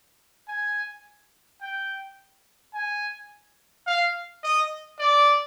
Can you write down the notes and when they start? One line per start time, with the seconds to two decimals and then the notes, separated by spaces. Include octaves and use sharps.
0.48 G#5
1.62 G5
2.74 G#5
3.87 F5
4.44 D#5
5.00 D5